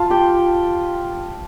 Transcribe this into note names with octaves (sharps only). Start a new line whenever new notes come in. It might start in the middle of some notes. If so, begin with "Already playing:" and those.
Already playing: F4 F5 A5
G4 G5